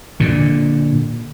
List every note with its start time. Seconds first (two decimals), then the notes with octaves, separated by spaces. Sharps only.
0.20 A#2 D3